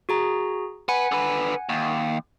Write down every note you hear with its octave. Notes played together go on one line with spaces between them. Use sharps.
F#4 G#4 A#5
B4 F#5 G#5
D3 B4
D#2